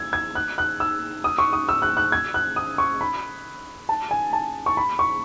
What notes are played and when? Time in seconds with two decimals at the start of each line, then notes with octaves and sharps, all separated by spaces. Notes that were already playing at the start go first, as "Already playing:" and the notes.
Already playing: E6 G#6
0.13 G#6
0.35 F#6
0.58 F#6
0.80 E6
1.24 D#6
1.38 C#6
1.53 D#6
1.69 E6
1.82 F#6
1.97 F#6
2.12 G#6
2.34 F#6
2.56 D#6
2.78 C#6
3.01 B5
3.89 A5
4.11 G#5
4.33 A5
4.66 C#6
4.77 B5
4.99 C#6